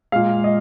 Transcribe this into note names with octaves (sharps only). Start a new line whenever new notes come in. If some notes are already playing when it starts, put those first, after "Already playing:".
A#2 G#3 F5
D#5